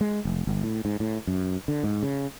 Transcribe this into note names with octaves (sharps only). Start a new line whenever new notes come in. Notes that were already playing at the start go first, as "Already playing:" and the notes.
G#3
F1
G1
A2
G#2
A2
F#2
D3
G#2
C#3